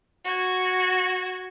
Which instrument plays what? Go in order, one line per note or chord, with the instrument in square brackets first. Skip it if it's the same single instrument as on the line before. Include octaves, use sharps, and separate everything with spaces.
[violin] F#4 G#6